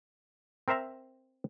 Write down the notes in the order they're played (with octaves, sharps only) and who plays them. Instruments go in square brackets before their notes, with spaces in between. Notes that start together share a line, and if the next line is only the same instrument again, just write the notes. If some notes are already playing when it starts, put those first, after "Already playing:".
[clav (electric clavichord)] C4 A#4 C5 E5 A#5